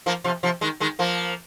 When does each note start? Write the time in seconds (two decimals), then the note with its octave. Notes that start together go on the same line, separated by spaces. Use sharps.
0.06 F3 A#3
0.24 C3 F3
0.43 C3 F3
0.61 D#3 G#3
0.80 D#3 G#3
0.99 F3 A#3